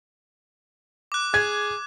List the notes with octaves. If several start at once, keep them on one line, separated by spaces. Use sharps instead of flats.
D6 F#6
G#4 G#6